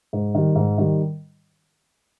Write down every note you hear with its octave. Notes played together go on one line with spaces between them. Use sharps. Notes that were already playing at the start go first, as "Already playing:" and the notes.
G#2
D#3 G3
G#2
D#3 G3